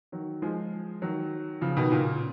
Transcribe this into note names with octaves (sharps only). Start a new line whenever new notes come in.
D#3 F#3
F3 G#3
D#3 F#3
C#3 F3
B2 D#3
A#2 C#3